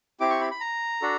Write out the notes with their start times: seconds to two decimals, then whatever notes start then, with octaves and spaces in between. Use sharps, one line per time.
0.20 C4 E4 G4 D6
0.30 C#6
0.41 B5
0.51 B5
0.61 A#5
1.02 D4 F#4 A4